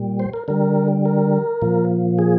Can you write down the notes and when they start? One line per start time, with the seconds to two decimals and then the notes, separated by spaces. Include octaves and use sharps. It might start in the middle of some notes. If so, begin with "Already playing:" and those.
Already playing: A#2 G3
0.20 C5
0.34 A#4
0.48 D3 G3 A#4
1.05 A#4
1.62 A#2 F3
2.19 G#4